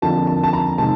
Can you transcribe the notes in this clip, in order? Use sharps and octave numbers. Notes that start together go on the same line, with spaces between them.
F2 D3 F3 A#3 A5
A5
A5
A#5
C3 D#3 G#3 C4 A5